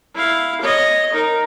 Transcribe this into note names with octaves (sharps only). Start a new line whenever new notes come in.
E4 F5
C#5 D#5
D#4 A#4